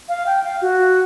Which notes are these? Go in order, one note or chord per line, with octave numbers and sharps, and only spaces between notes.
F5
G5
F5
F#4